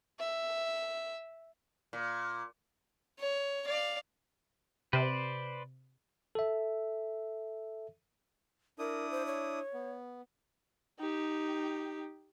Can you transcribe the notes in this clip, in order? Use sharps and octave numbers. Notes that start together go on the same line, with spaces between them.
E5
A#2
C#5
D5 F5
C3 B4 C5 D5
A4 E5
D4 E4 A#4 D#6
C5
C#5
B3
D#4 G4